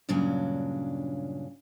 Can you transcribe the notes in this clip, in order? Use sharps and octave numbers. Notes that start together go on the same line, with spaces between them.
G2 A#2 C#3 F#3 D4